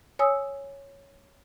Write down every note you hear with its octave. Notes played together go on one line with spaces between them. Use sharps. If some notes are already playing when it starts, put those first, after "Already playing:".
C#5 G#5 D#6 E6